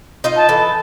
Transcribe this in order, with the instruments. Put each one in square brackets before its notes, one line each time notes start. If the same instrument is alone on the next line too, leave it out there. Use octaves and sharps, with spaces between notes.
[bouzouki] D#4 F4 D#5
[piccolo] A5
[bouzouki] E3 A4